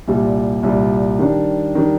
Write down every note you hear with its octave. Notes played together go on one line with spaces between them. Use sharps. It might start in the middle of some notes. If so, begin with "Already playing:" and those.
C2 A#2 G3
C2 A#2 G3
D#3 G3 D4
D#3 G3 D4